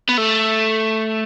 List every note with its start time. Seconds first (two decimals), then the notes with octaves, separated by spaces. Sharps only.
0.09 B3
0.17 A3